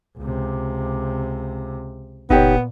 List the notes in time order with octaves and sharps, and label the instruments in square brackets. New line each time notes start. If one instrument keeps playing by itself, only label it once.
[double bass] C#2 C3
[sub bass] F#1 [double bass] A#2 [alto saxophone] B3 [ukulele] D#4 G4 C#5